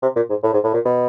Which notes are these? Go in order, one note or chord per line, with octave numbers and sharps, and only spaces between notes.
C3
A#2
G#2
A2
G#2
A2
A#2
B2